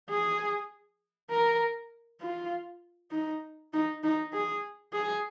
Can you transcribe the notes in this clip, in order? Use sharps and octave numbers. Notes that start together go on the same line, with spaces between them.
G#4
A#4
F4
D#4
D#4
D#4
G#4
G#4